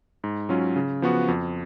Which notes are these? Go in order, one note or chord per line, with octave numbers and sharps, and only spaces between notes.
G#2
F#3 C#4 F4
C#3
F3 B3 F#4
F2